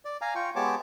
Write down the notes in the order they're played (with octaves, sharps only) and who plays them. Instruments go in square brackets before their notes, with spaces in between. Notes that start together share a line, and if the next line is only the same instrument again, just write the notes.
[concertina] D5
F5 G#5 A#5
F4 G5 C#6
G#3 B3 G4 C#5 A5 D6